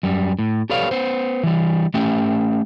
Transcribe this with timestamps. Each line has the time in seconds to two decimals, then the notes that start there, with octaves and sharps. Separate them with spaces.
0.03 F#2 G3
0.39 A2
0.70 G4 A4 B4 C#5 D5 F5
0.91 B3 C5
1.43 E3 G3
1.94 A3 C#4 G4 E5 G5